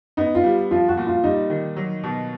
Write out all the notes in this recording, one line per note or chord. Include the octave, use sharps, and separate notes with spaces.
B3 D#4
F4
G3
F3 F4
F#4
A#2
F4
G3 D#4
D#3
F#3
B2